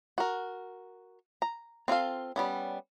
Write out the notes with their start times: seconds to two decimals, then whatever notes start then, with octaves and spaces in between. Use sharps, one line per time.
0.18 F#4 A#4
1.42 A#5
1.88 C4 F4 A4 F5
2.36 G3 B3 C#4